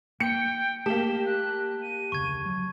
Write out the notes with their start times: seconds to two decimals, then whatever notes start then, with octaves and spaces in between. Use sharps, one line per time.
0.20 A#3 G5 C#7
0.86 A3 A#3 G4 A5 E7 G7
1.26 F#6
1.82 D#7
2.12 F1 D2 C#3 C#6 G#6
2.46 F#3